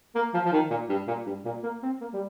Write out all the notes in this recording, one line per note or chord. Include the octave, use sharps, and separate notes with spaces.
A#3
F3
F3
D#3
A#2
G2
A#2
G2
A#2
A#3
C4
A#3
G3